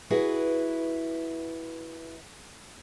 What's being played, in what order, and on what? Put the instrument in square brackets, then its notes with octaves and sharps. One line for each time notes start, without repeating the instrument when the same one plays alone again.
[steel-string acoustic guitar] E4 F#4 G#4 B4